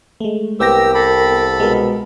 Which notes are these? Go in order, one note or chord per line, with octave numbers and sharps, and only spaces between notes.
G#3 A3
C2 B3 G4 A#4 G5 E6 A#6
A4 B5
B2 G#3 A#4